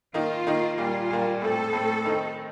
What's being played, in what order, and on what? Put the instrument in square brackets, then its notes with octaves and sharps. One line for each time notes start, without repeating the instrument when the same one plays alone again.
[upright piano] D#3 A#3 D#4 [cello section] F4
[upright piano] D#3 A#3 D#4
[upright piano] A#2 G3 A#3 [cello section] F4
[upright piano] A#2 G3 A#3
[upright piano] A2 A3 C4 [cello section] A4
[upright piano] A2 A3 C4
D#3 A3 C4 D#4